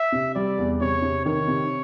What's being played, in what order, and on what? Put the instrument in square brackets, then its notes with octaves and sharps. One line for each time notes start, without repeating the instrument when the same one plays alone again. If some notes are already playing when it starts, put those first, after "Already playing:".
Already playing: [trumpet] E5
[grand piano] C3
[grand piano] G3 [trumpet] D5
[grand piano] E2
[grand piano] C3 [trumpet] C#5
[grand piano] C3
[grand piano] D#3 [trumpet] C#5
[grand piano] C3